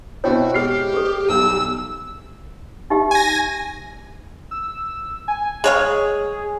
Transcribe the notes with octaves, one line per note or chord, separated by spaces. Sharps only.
B2 C4 E4 F#4 C#5 G5
G#3 G4 F6 C7
G#4 A4
B1 G3 E6
D#4 G4 E5
G#5 A#6
E6
G#5
G#3 G#4 C#5 F5